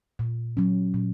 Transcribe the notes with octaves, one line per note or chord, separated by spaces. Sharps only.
A#2
F#3 C#4
A#2